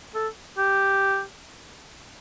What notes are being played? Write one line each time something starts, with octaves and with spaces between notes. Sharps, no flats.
A4
G4